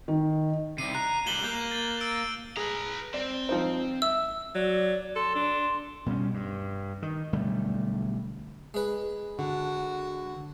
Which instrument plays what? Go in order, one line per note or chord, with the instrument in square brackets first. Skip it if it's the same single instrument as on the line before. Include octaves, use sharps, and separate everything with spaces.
[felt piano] D#3
[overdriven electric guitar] C3 G3 [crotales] C7 D#7
[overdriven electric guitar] A#5 [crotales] F#6
[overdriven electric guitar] A#2 G3 [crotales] E7 F#7 G7
[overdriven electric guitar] A#3 [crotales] G6
[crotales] A6
E6 D7
[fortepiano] G#4 [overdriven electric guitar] B4 A#5
[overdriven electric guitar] C4 [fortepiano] D5
[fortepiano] F3 D#4 C5
[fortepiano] E5 [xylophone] E6
[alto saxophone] F#3 [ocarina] D5
[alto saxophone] A4 [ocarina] C6
[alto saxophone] D4
[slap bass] B2 G3 C4 C#4
G2
D#3
B1 D3 G3 A3
[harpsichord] G#3 B4
[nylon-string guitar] D3 [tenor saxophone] F#4